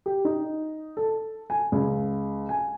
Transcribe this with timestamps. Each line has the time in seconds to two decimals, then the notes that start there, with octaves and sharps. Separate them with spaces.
0.06 G4
0.25 D#4
0.97 A4
1.50 G#5
1.72 C#2
2.49 G#5